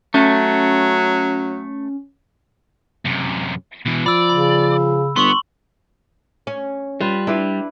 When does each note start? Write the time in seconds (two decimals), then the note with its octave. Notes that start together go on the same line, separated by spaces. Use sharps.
0.14 F#3 A3 C#4
3.05 F#2 C3
3.86 B2 E3
4.06 F3 D5 B5 E6
4.30 C#3 B5
5.16 G1 B3 C6 C#6 F#7
6.47 C#4
7.01 G3 F4 B4
7.27 D4 E4 B4 F5